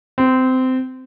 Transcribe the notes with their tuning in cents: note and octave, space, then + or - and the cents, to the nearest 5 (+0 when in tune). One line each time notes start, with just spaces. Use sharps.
C4 -20